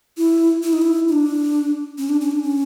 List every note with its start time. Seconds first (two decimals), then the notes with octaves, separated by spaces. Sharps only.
0.18 E4
0.63 E4
0.73 D#4
0.82 E4
1.08 D#4
1.12 D4
1.98 C#4
2.09 D4
2.21 C#4
2.31 D4
2.43 C#4